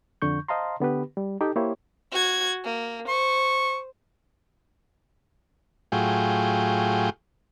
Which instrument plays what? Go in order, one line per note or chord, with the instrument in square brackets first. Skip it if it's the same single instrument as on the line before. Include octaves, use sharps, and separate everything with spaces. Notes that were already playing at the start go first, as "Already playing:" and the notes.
[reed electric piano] F2 D3 C#6 G6
C5 D#5 F5 A5 A#5 C6
D3 B3 G4 B4
G3
D#4 G4 A4 G5
A#3 E4 G4 C5 C#5
[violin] F#4 G#6
A#3
[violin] C5 [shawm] C#6
[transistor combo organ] A2 F#3 F4 G#4 G5